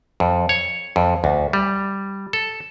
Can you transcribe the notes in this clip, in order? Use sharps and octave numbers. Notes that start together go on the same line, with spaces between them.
F2
C#5
F2
D2
G3
A4